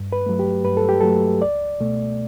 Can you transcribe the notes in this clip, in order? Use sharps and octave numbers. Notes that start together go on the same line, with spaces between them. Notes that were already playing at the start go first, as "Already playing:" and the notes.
Already playing: G2
B4
F#3 A3
G4
G2 B4
A4
G4
F#3 A3 A4
C#2 D5
B2 A3